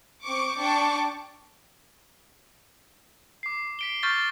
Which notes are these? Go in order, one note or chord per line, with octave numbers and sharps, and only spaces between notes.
C4 C#6 D6
D4 G5 C#6 D6
D6 C7
B6 D7 G7
C#6 F6 G6 A6 B6 G7